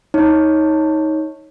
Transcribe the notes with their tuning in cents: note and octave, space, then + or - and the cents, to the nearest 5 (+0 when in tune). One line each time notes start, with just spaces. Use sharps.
D#4 +20 C#5 -5